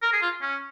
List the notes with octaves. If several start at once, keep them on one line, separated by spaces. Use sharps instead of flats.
A#4
G#4
F4
C#4